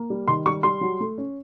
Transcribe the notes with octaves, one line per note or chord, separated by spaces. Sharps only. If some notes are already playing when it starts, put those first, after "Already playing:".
Already playing: A#3
G3
D#3 C6
G3 C#6
G3 C6
F#3
A3
C#4